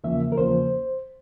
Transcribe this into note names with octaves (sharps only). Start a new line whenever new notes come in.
E2 C#3 F3 A#3 E5
A#4
E2 C#3 F3 A#3 C5